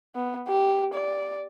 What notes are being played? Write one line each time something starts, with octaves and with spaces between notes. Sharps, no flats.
B3
G4
D5